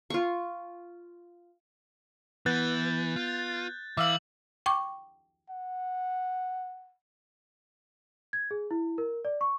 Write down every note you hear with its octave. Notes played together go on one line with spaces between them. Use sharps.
F4 C#6
E3 B3 F#6 G6 A6
F4
E3 E5 F5 D6 E6 F#7
G5 C#6 D6
F#5
G#6
G#4
E4
A#4
D5
C#6